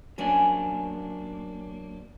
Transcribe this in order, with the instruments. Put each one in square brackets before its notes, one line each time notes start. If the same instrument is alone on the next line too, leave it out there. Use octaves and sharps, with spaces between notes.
[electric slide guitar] F#3 A#3 D4 [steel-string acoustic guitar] C#4 G#5